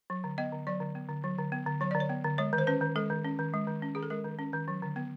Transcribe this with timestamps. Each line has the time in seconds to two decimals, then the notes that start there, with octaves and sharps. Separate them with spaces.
0.10 F#3
0.24 D3
0.38 B3 D#5
0.53 D3
0.67 F#3 D5
0.80 D3
0.95 B3
1.09 D3
1.24 F#3
1.38 D3
1.52 B3
1.67 D3
1.81 F#3 C#5
1.91 D3 D5
2.00 C#5
2.10 B3
2.24 D3
2.38 G#3 C#5
2.53 D#3
2.58 C5
2.67 C#4 B4
2.81 D#3
2.96 G#3 A4
3.10 D#3
3.25 C#4
3.39 D#3
3.54 G#3
3.67 D#3
3.82 C#4
3.95 D#3 G#4
4.03 A4
4.10 G#3 A#4
4.25 D#3
4.39 C#4
4.53 D#3
4.68 F#3
4.82 D3
4.96 B3